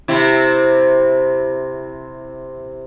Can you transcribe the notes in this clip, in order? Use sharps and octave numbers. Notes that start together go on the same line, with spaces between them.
C3 C4 E4